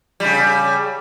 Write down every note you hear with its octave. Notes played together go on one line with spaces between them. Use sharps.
C#3 G3